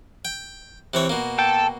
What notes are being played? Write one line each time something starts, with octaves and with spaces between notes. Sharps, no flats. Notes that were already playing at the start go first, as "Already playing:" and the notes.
G5
C3 E3 C#5
B2 A#3
A4 G5